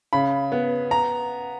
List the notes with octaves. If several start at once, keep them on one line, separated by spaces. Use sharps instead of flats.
C#3 B5
B3
A#5